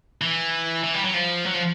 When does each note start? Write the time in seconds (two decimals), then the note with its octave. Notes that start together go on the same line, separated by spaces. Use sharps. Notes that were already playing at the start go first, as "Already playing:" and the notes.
0.21 E3
0.84 E3
0.94 G3
1.04 F#3
1.14 F3
1.46 F#3
1.54 F3